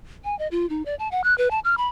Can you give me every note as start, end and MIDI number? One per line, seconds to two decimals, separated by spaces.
0.24 0.37 80
0.39 0.48 75
0.51 0.68 65
0.70 0.83 63
0.86 0.95 74
0.99 1.08 81
1.12 1.22 78
1.24 1.36 90
1.38 1.51 71
1.51 1.59 81
1.65 1.77 89
1.77 1.88 83